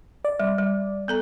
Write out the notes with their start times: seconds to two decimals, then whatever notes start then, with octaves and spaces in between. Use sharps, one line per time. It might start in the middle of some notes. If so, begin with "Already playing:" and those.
0.25 D5
0.40 G3
0.58 G3
1.08 B3 A4 A#5